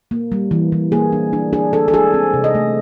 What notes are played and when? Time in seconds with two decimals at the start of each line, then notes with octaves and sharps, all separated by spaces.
0.11 A#3
0.32 G3
0.51 E3
0.72 E3
0.92 A#3 G#4
1.13 D4
1.33 D4
1.53 D4 G#4
1.73 D4 A4
1.88 A4
1.93 D4 G#4
2.14 C4
2.34 C3
2.44 D#5
2.55 A3